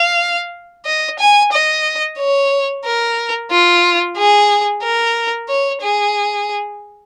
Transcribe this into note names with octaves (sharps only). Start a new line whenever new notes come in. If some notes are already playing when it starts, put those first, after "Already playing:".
Already playing: F5
D#5
G#5
D#5
C#5
A#4
F4
G#4
A#4
C#5
G#4